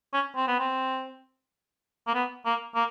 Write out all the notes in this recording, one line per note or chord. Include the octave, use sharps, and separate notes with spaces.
C#4
C4
B3
C4
A#3
B3
A#3
A#3